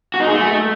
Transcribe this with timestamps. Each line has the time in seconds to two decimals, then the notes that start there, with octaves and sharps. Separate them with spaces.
0.14 F#4
0.21 D#4
0.27 G#4
0.34 A3